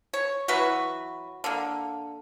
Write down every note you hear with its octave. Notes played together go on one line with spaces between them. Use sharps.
C#5
E3 F#3 F#4 B4
D3 A#3